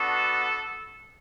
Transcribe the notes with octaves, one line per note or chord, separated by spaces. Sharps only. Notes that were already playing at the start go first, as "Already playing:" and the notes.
Already playing: B3 D4 F#4 A4